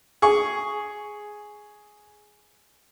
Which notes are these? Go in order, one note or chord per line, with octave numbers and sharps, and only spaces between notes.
G#4 C#6